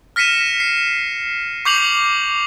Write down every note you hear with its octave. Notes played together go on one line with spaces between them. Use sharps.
F6 A#6 B6 C#7 D#7 E7
C7
C#6 D6 G6 C7 F7 F#7